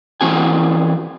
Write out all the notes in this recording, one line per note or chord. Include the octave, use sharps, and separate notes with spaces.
E3 C4 F#4 G#5